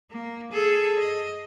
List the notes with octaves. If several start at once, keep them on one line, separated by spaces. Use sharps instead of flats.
A#3
G#4 A4
D#5